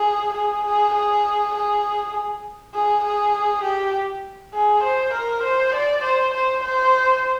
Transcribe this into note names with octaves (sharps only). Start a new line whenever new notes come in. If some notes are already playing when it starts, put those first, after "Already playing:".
Already playing: G#4
G#4
G#4
G#4
G#4
G#4
G#4
G4
G#4
C5
A#4
C5
D5
C5
C5
C5